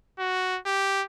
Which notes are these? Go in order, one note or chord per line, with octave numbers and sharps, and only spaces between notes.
F#4
G4